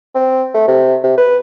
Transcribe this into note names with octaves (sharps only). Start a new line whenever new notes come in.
C4
A3
C3
C3
B4